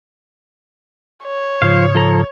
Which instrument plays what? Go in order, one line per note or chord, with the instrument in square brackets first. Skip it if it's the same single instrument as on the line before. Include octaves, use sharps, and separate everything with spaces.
[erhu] C#5
[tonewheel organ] G#2 C#3 [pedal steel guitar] F3 C5 F5
[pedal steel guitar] F3 A4 A#5